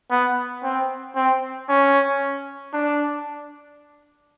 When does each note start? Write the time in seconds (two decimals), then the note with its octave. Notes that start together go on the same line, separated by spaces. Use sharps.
0.11 B3
0.63 C4
1.16 C4
1.69 C#4
2.73 D4